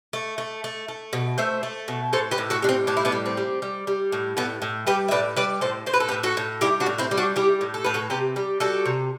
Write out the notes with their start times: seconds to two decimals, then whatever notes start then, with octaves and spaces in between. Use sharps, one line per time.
0.13 A3
0.38 A3
0.64 A3
0.88 A3
1.13 B2
1.38 A3 C5 E5
1.63 A3
1.88 B2
2.13 A2 A4 C5
2.31 G4 B4
2.38 A2
2.50 F#4 A4
2.62 G3 D4
2.69 C4
2.87 A2 D4
2.97 E4
3.05 B3 D4
3.12 G3
3.26 C4
3.37 G3
3.62 G3
3.87 G3
4.12 A2
4.37 A2 B3
4.62 A2
4.87 G3 G4 B4
5.08 E5
5.11 A2 B4 D5
5.36 G3 B4 D5
5.61 A2 A4 C5
5.86 A2 C5
5.94 B4
6.00 A4
6.08 G4 B4
6.11 A2
6.23 F#4 A4
6.37 A2
6.61 G3 E4 G4
6.80 D4 F#4
6.86 A2
6.98 C4 E4
7.11 G3
7.17 D4 F#4
7.36 G3 E4 G4
7.61 A2
7.74 A4
7.85 A2 B4
7.94 F#4 A4
8.10 C3 G4 B4
8.36 G3
8.60 G3 F#4 A4
8.85 C3